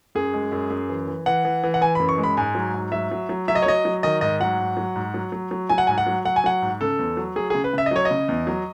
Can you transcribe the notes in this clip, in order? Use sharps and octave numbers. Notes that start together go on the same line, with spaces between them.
F#2 G#4
G#3
F#2
F#2
E3
E3
E3 F#5
E3
E3
F#5
E3 G#5
F#2 B5
C#6
G#3
B5
G#2 G#5
F#3
G#2
F#3 E5
F#3
F#3
F#3 E5
D#5
C#5
F#3 D#5
F#3
D#3 D#5
G#2 D#5
F#3 F#5
G#2
F#3
G#2
F#3
F#3
F#3
F#3 G#5
F#5
G#2 G#5
F#5
F#3
F#3 F#5
G#5
F#3 F#5
G#2
C#3 A4
E2
F#3
F#3 G#4
C#3 G#4
B4
C#3 E5
D#5
F#3 C#5
D#5
C#3
E2
F#3